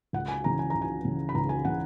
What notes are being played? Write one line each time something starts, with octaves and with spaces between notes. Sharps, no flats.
C#2 F#5
G#5
C#3 E3 A#5
G#5
C#2 A#5
G#5
C#3 E3
B5
C#2 A#5
G#5
C#3 E3 F#5